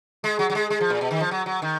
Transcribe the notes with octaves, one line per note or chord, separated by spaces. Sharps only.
G#3
F#3
F#3
G#3
G#3
F3
A#2
B2
D#3
F3
F#3
F#3
D#3